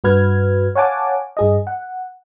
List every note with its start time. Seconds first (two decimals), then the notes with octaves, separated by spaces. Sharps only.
0.04 G2 F#4 B4 F6 G#6
0.75 C#5 F5 F#5 G#5 A5 D6
1.37 G2 G#4 D#5
1.67 F#5